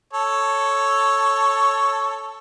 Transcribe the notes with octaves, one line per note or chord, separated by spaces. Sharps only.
A4 C#5